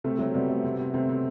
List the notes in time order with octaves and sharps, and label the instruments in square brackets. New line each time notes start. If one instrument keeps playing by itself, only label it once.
[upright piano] C3 [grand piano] A3 C4
[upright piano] F#3 [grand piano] A3 C4
[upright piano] C3 [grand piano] G3 B3
[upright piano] A3
C3
C3
[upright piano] C3 [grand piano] A3 C4
[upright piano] C3